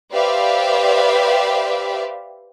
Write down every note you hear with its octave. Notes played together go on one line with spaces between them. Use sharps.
G4 B4 C5 D5 E5 F5